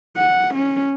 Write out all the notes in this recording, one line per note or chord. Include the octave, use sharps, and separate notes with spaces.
F#5
C#4